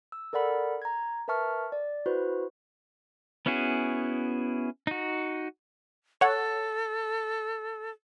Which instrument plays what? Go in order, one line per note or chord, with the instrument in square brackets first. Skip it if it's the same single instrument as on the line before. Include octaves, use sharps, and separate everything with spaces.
[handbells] E6
A4 A#4 D5 F#5 B5
A#5 G#6
A#4 B4 E5 A5 C#6 F6
D5
E4 F#4 B4 C5
[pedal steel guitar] B3 C#4 E4 F#4 G#4
D#4 F#4
[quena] A4 [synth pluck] C#5 F#5